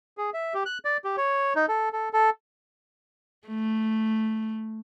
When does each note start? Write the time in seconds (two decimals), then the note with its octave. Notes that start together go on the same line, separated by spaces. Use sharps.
0.18 G#4
0.34 E5
0.54 G4
0.66 F#6
0.85 D5
1.04 G4
1.17 C#5
1.56 D#4
1.68 A4
1.93 A4
2.13 A4
3.48 A3